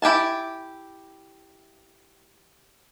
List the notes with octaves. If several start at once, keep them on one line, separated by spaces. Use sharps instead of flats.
E4 G4 G#5 A5